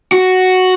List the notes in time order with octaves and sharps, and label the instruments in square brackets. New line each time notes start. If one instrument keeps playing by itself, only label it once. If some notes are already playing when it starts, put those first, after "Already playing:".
[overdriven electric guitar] F#4